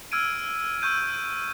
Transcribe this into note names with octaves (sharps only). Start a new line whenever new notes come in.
E6 F6 G#6 D7 D#7
C#6 E6 G6 D#7